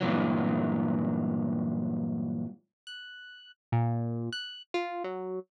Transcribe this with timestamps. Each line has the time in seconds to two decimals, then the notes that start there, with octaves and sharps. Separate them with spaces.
0.01 G2 A#2 E3 F#3
2.87 F#6
3.72 A#2
4.33 F#6
4.74 F4
5.04 F#3